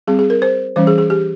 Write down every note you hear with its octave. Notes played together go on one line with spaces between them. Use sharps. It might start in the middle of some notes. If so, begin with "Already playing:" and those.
G3 C4 G#4
G#4
A#4
C5
E3 G3 C#4 C5
G#4
G#4
G4